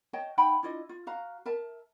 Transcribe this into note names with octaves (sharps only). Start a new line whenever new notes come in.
C#5 D#5 G5 A5
D#4 F#5 G5 B5
D4 E4 F4 D#5
F4
F#4 F5 A#5
A#4 E5 A5